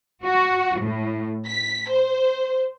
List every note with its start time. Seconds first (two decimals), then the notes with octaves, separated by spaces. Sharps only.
0.25 F#4
0.81 A2
1.47 B6
1.90 C5